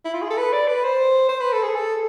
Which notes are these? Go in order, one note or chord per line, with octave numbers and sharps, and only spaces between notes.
E4
F4
G#4
A4
B4
D5
B4
C5
C5
B4
A4
G#4
A4